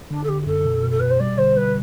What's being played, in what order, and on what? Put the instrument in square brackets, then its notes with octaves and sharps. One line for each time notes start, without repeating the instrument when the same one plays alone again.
[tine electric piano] D3 [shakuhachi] D4
[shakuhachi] A4
[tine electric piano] D3 [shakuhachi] G4
[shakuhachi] G4
[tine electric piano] F#2 [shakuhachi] A4
[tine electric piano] B2
B2
[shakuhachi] A4
[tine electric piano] B2 [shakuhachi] B4
[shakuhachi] C5
[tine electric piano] G3 [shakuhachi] D5
[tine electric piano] D3 [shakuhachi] C5
[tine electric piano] G3 [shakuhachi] B4